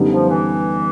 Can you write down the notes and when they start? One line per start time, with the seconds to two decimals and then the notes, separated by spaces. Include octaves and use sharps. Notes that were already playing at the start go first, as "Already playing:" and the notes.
Already playing: F#2 D3 G3 B3 D#4
0.11 F3
0.29 E3